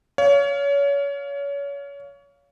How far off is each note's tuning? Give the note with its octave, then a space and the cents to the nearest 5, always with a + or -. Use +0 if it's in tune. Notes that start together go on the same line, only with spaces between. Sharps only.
C#5 +30 F5 +0